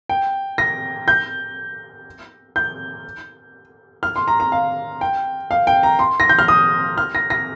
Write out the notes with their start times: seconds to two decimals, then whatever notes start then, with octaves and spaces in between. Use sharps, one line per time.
0.09 G5
0.58 A#6
1.08 G6
2.56 G6
4.03 F6
4.16 C6
4.28 A#5
4.40 A#5
4.52 F5
5.01 G5
5.51 F5
5.67 G5
5.83 A#5
5.99 C6
6.20 A#6
6.29 G6
6.39 F6
6.48 D#6
6.98 F6
7.15 A#6
7.30 A#6